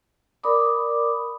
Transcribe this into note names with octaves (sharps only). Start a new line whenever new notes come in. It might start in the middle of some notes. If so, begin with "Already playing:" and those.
A#4 D5 B5 D6 D#6